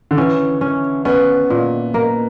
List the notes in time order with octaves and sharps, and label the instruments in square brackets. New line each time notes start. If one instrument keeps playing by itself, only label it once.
[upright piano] D3
[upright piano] E3 [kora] C#4
[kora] C#4
[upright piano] B3 [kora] C#4
[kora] A#2
A#3